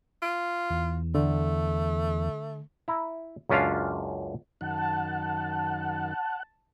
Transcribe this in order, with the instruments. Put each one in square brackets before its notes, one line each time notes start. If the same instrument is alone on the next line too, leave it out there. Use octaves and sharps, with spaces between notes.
[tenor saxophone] F4
[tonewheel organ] E2
[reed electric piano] D3 [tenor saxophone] A3
[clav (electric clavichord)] E4 A#5
C#2 F#2 C#4 D4 F4 F5
[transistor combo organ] F#2 D#3 [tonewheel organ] F#5 [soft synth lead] A5